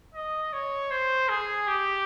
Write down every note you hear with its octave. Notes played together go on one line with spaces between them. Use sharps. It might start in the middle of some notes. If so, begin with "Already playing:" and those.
D#5
C#5
C5
G#4
G4